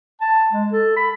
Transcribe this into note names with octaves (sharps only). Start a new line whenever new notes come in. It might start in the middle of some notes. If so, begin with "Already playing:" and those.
A5
G#3
A4
B5